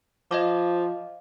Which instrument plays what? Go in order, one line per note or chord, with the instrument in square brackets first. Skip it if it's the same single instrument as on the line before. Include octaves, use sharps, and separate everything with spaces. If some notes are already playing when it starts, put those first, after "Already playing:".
[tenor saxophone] F3 [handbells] D#5 F5 D6